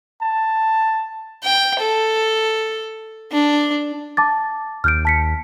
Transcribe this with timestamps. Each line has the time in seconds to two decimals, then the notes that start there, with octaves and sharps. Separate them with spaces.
0.22 A5
1.44 G5
1.80 A4
3.32 D4
4.17 A5 D6 A6
4.84 D#2 F6 G6 D7
5.05 A5 B6 C#7